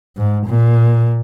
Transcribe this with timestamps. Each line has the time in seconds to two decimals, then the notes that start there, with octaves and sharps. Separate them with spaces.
0.17 G#2
0.47 A#2